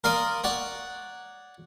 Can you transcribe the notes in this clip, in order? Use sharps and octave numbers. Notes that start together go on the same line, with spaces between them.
A#4 D5 F5 C6 D#6
C#5 D5 F#5